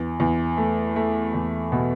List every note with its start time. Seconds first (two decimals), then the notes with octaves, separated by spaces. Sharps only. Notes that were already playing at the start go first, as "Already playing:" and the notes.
Already playing: E2
0.20 E2
0.57 A3
0.96 A3
1.34 E2
1.72 B2